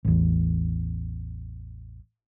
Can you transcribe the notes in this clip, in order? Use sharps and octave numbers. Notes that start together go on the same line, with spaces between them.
A1 E2